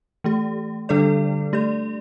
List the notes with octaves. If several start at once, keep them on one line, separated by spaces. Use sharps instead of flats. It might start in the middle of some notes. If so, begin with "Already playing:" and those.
E3 A3 G4
D3 G3 D4 A4 D5
A3 G4 D5